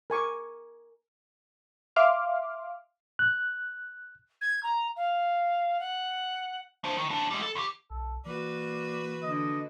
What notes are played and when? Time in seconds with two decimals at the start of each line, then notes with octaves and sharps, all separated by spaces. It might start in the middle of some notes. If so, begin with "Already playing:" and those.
0.10 A#4 G#5 C#6 D6
1.96 E5 F5 C6 D6 F6
3.19 F#6
4.41 G#6
4.63 A#5
4.96 F5
5.79 F#5
6.84 D4 C5
6.97 D#3
7.09 D#2 D4
7.31 G3 G#3
7.42 A4
7.55 D#2 G4
7.90 B1 A4
8.26 E3 A#3 F#4 B4 D5
9.23 D3 D#5